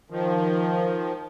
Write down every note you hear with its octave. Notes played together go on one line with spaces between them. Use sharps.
D#3 F3